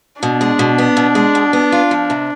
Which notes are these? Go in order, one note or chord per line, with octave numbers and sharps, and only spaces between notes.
B2 D4
G#3
B2
B3
B2
G#3
B2
B3
F4
F3
C3